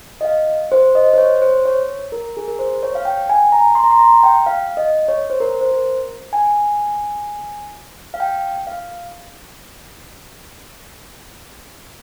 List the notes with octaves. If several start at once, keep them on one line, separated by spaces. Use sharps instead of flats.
D#5
F5
C5
D#5
C5
C#5
C5
C#5
A#4
G#4
A#4
C5
C#5
F5
G5
G#5
A#5
C6
A#5
C6
A#5
G5
F5
D#5
C#5
C5
A#4
C5
A#4
G#5
F5
G5
F5